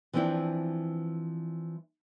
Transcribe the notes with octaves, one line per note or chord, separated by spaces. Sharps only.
E3 F3 C4 D4 E4